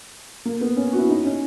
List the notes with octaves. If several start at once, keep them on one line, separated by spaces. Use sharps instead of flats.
A#3
B3
C#4
F#4
E4
D#4
C#4